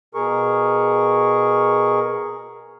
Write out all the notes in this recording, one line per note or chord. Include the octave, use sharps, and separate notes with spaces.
B2 G#4 A#4 C#6